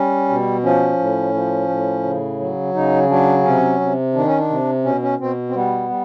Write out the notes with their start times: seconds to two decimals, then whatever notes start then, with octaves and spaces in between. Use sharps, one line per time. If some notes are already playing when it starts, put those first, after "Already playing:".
Already playing: G3 C#4
0.29 B2
0.64 F3 C#4
0.99 A2
1.34 F3
1.68 A2
2.03 C#3
2.40 F#3
2.74 C#3 D#4
3.09 F#3 D4
3.44 C3 C#4
3.80 C3
4.14 D#3 D4
4.26 C#4
4.38 D4
4.49 C3
4.84 B2 C#4
5.02 C#4
5.19 B2 C4
5.49 C4
5.54 G3 B3
5.90 G3